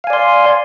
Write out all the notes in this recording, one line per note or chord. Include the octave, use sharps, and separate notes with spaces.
D5 F5 G#5 C6